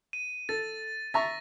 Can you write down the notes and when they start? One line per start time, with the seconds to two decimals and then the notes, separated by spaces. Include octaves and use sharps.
0.13 D#7
0.49 A4 A6
1.14 E5 A#5 C#6 A6 A#6